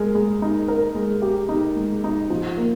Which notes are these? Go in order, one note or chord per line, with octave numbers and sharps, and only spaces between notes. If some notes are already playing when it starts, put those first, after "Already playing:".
Already playing: G#3 A#4
G#3
D#4
A#4
G#3
G4
D#4
G#3
D#4
F3
A#3